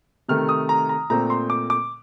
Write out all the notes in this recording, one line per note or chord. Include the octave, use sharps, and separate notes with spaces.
C3 D#3 A3 F6
D#6
A#5
A#5
A#2 A3 C4 A#5
C6
D6
D6